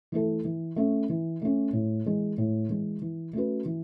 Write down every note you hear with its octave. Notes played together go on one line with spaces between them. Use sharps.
E3 A3 E4 A4
E3
A3 C#4
E3
A3 C#4
A2
E3 G#3
A2
E3 G#3
E3
A3 C#4 F#4 B4
E3